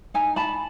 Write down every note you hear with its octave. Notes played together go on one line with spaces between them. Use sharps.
D#4 G#5 A#5
A5 B5